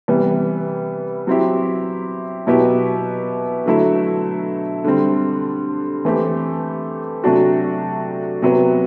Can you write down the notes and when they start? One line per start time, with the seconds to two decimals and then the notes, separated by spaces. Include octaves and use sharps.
0.08 C3 E3 G3 B3
1.27 F#3 C4 E4 G4
2.47 B2 F#3 B3 E4 G4
3.66 D3 F#3 A3 E4
4.84 D3 G3 C4
6.05 E3 A3 C4 G4
7.24 C3 F#3 A3 D4 F#4
8.42 C3 F#3 B3